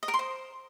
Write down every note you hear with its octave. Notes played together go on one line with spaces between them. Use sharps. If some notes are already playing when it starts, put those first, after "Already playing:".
D#5
A#4
C6
C5